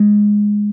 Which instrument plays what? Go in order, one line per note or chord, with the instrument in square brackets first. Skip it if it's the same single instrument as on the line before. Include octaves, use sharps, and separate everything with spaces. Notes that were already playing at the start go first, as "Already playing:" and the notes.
Already playing: [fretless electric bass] G#3